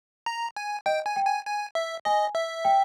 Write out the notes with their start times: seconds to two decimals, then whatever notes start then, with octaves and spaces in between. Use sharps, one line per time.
0.26 A#5
0.56 G#5
0.86 D#5 G5
1.06 G#5
1.16 G5
1.26 G#5
1.46 G#5
1.75 E5
2.05 D#5 G#5
2.35 E5
2.65 G5